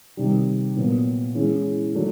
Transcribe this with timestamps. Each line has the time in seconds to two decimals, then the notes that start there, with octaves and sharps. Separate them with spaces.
0.17 C3 D#3 G3
0.76 A#2 F#3 B3
1.35 E3 G#3 C#4 E4
1.95 F#3 A3 D4 F#4